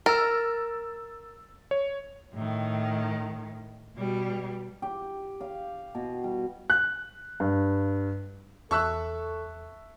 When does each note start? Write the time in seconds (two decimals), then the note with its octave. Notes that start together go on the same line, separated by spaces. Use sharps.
0.06 A#4 E6 A6
1.71 C#5
2.34 A2 D#3
3.97 B2 G3
4.82 G4
5.41 F5
5.95 B2
6.24 G3
6.70 F#6
7.40 G2
8.71 E2 A4 E5 A5 C#6 E6 F#6